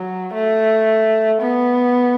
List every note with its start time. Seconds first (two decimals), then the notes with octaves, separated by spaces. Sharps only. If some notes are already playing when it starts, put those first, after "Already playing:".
Already playing: F#3
0.34 A3
1.42 B3